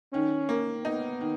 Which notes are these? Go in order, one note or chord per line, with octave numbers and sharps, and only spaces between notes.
D#3 C#4
A#3
B3 D#4
D#3